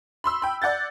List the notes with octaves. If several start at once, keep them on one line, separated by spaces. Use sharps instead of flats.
B5 C6 E6
G5 B5
D5 F#5 G6 A6